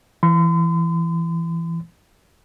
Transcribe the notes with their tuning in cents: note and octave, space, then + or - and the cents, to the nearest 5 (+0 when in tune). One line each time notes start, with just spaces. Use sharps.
E3 +20 C6 -45